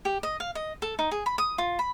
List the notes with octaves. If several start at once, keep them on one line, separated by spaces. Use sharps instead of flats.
G4
D#5
F5
D#5
A4
D#4
G#4
B5
D#6
F4
B5